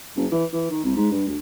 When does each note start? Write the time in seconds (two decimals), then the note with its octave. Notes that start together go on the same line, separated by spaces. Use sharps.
0.16 F#1
0.31 E3
0.53 E3
0.70 D#3
0.84 C2
0.96 G#2
1.11 G2
1.27 D2